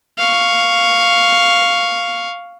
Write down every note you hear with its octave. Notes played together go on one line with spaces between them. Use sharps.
F5 C#6